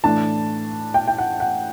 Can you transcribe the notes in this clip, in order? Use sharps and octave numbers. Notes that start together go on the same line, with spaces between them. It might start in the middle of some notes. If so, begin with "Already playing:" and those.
A2 E3 A3 D4 A5
G5
G5
F#5
F#5